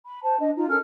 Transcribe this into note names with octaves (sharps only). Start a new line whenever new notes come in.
B5
C5 A5
D4 D#5
D#4 F4
C#4 A4 A#4 F6